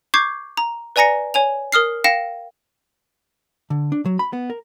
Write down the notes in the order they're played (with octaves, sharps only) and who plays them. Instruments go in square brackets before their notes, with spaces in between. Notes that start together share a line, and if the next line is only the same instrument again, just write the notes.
[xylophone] C#6 D6 G6 G#6 C7
A#5
B4 D5 G#5 A#5 A#6 C#7
C#5 G#5 F7
A#4 D#6 F6 C7
F5 G5 A#6 C#7 E7
[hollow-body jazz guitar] D3
D4
F#3
B5
B3
A#4